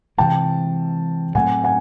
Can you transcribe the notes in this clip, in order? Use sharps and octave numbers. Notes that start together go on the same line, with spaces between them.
C3 E3 G#3 G5 A5
A2 F#3 A3 C4 F#5 G#5
F#5 G#5